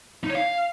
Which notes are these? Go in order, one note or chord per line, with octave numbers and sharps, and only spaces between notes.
D#4
C#5
F5